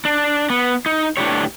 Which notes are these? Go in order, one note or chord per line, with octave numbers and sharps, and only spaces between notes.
D4
B3
D#4
A2 G#3 D4 G4 C#5